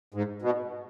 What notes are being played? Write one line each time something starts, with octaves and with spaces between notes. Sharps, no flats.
G#2
B2